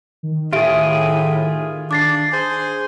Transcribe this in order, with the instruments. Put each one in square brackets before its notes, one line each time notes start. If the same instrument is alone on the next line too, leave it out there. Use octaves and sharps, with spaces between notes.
[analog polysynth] D#3
[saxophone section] A2 [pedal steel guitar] F4 G#4 [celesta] G4 E5 D7
[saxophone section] D4 [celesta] D6 A6 C7
[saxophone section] G#4 C5